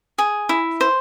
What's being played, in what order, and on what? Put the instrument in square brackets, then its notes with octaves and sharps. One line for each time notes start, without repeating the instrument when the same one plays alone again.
[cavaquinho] G#4
E4
C5